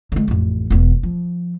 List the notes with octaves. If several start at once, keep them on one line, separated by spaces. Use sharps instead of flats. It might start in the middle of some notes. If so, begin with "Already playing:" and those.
D3 G#3
A1 F2
E1 B3
F3